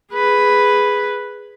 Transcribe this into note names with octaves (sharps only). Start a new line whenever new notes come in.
G#4 B4